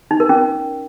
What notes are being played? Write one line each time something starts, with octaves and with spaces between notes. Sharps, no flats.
D#4
A#4
C#4